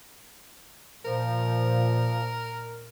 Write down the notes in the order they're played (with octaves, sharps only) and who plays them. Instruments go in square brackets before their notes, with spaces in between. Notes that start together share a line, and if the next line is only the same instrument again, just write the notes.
[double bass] A#2 [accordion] F3 [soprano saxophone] A#4